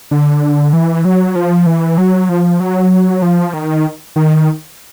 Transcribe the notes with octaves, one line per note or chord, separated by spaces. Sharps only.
D3
E3
F#3
F3
E3
F#3
F3
F#3
F3
D#3
D#3